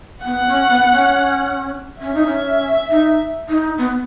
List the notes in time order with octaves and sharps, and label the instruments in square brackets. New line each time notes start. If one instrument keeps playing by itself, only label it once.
[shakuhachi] B3 [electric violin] F#5
[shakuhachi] C#4
B3
C#4
[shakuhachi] C#4 [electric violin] E5
[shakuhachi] D#4
C#4
D#4
D#4
B3